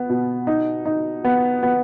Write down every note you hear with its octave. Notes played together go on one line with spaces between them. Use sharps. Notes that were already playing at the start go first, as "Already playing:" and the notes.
Already playing: B3
B2
D#4
D#4
B3
B3